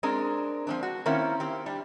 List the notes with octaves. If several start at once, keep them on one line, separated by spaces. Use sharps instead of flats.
G#3 C4 D4 A#4
F3 C4 D4
F#4
D#3 A#3 C4 C#4 E4
C4 G4
G3 D4